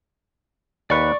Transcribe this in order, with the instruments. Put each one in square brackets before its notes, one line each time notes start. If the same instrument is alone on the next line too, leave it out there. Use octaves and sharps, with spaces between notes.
[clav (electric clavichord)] D#2 B4 [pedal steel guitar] D5 C#6